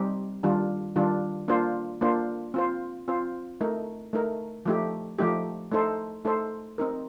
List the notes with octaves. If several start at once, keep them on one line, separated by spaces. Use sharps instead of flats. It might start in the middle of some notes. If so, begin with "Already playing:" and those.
Already playing: G3 C4 D#4 G4
D#3 G3 D4 F4
D#3 G3 D4 F4
A#3 D4 F4 C5
A#3 D4 F4 C5
C4 F4 C5
C4 F4 C5
A3 D#4 A#4
A3 D#4 A#4
F3 A3 D#4 G4
F3 A3 D#4 G4
A3 D#4 A4 C5
A3 D#4 A4 C5
C4 D#4 A#4